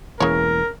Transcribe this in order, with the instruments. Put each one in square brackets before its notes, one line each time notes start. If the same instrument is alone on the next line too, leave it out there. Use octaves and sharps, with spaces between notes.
[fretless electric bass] E1 E3 A#3 [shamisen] C#3 C#5 [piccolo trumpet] A#4